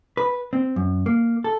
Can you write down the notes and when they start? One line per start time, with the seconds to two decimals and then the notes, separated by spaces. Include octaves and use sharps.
0.17 B4
0.53 C4
0.76 F#2
1.06 A#3
1.44 A4